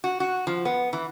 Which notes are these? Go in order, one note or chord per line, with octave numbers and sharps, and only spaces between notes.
F#4
F#4
F3
B3
E3